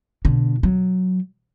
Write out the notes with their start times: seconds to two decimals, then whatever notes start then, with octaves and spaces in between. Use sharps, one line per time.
0.25 B2 D3
0.63 F#3